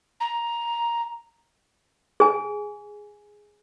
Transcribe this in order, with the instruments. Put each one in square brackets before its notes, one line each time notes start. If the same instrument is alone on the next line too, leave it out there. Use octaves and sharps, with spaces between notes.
[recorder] A#5
[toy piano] G#4 G#5